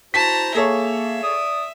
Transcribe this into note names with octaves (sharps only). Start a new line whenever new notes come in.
E4 F#4 C5 A5 A#5 B6
A#3 G#4 A4 C#5 E5
D5 D#6